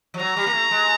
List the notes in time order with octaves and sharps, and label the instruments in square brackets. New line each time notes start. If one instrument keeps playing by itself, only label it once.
[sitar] F3
[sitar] F#3 [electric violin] A#5
[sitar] G3
A#3
A3
G#3